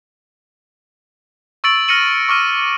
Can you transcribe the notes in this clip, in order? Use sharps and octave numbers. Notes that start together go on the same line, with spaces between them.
C#6 E6 A6 D7 F#7
F6 A#6 C#7 D#7 F#7
C#6 D6 F6 D#7